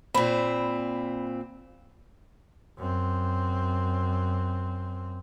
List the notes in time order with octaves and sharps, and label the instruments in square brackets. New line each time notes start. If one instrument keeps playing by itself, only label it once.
[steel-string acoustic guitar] A#2 C4 [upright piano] B5
[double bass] F#2 C4